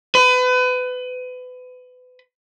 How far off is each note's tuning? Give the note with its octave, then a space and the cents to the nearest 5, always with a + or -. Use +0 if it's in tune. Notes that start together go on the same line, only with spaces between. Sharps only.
B4 +30